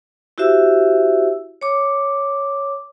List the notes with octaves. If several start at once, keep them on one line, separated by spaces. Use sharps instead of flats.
E4 F#4 G4 C5 E5 E6
C#5 D6